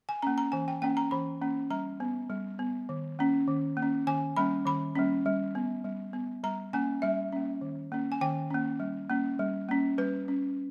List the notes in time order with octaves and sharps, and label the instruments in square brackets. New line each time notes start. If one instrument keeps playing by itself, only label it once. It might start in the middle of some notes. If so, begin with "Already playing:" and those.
[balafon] G#5
A#3 C#4 A#5
A#5
E3 G#5
G5
A#3 C#4 G5
A#5
E3 B5
A#3 C#4
G3 A#5
B3
G3
B3
D#3
A#3 C#4
D#3
A#3
C#4
D#3 G#5
G3 A#3 C#4 B5
D#3 B5
G3 A#3 C#4
G3
B3
G3
B3
G3 A#5
A#3 C#4 G#5
G3 E5
A#3 C#4
D#3
A#3 C#4
G#5
D#3 G5
A#3 C#4
G3
A#3 C#4
G3
A#3 C#4
G3 B4
C#4